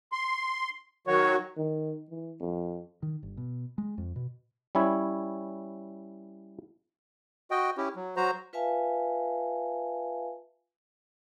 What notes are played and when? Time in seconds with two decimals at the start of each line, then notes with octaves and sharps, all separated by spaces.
0.12 C6
1.07 D#3 F#3 F#4 C#5
1.57 D#3
2.09 E3
2.40 F2
3.02 D#3
3.23 G1
3.37 B2
3.78 G#3
3.98 F2
4.16 B2
4.75 G3 C#4 E4 C#5
7.51 F#4 D#5 G5
7.77 C#4 E4 G4
7.96 F#3
8.17 F#3 F#4 C5 A#5
8.53 F4 B4 E5 F5 G#5 A5